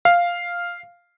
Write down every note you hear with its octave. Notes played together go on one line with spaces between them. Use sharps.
F5